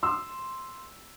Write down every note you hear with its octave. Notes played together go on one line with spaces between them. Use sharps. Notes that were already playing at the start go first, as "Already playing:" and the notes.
C6 E6